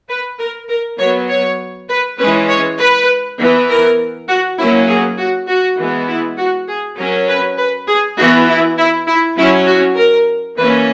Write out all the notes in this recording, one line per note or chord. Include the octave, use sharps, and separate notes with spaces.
B4
A#4
A#4
F#3 B3 C#5
C#5
B4
E3 G#3 C#4 B4
C#5
B4
E3 B3
A#4
F#4
F#3 A#3 C#4 E4
G#4
F#4
F#4
E3 G#3 B3
E4
F#4
G#4
F#3 C#4 A#4
B4
B4
G#4
E3 B3 F#4
E4
E4
E4
F#3 C#4 E4
F#4
A#4
E3 A#3 C#4 B4